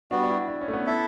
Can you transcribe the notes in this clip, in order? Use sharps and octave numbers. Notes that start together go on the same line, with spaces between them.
G3 B3 D4 F#4
D4
E4
D4
C#4
A3
B3
E4 A4 E5